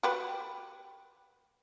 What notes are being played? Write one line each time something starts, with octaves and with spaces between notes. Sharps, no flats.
F#4 G4 B4